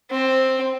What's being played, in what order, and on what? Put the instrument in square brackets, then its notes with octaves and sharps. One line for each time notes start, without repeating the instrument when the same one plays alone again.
[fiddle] C4